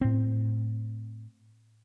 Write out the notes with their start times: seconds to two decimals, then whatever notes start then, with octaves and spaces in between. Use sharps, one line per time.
0.01 A2 C4